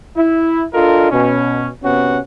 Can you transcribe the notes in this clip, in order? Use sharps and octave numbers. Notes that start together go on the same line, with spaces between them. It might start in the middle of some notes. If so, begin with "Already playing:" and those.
E4
D4 F4 A4 A#4 D#5
B2 C#4
C3 B3 C#4 F#4 F#5